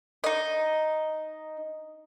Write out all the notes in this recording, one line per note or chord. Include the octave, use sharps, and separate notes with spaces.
D#4 D#5